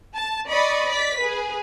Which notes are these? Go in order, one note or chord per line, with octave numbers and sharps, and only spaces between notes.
A5
D5 D#5 B5 C#6
D5 B6
G#4 B4